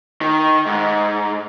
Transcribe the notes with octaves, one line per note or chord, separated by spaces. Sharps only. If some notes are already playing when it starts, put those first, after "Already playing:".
D#3
G#2